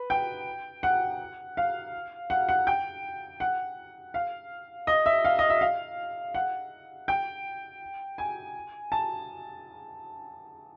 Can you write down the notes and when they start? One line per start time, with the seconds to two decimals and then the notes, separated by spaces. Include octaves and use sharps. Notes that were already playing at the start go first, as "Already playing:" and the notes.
Already playing: B4
0.10 G5
0.83 F#5
1.57 F5
2.30 F#5
2.49 F#5
2.67 G5
3.40 F#5
4.14 F5
4.87 D#5
5.06 E5
5.25 F5
5.39 D#5
5.50 E5
5.61 F5
6.35 F#5
7.08 G5
8.18 G#5
8.92 A5